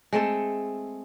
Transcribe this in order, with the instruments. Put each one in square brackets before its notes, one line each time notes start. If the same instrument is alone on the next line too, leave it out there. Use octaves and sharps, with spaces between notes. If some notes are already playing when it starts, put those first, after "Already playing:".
[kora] G#3 A3 C4 A4